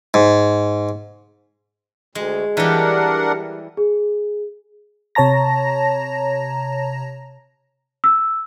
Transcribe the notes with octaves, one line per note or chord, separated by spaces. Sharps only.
G#2
D2 G#3
E3 G3 D4 A#4 F#5
G#4
C3 C#5 A5 A#5 A#6
E6